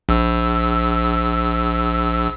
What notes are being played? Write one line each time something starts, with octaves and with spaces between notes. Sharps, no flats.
A#1 E6